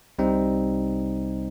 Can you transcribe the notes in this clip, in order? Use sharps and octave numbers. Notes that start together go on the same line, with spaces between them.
C2 C3 G3 C4 D#4